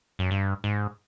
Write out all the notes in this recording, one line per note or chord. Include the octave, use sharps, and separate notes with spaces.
F#2
G2
G#2